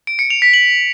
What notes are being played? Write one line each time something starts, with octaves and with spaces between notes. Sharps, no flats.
D7
C#7
F7
B6
F#7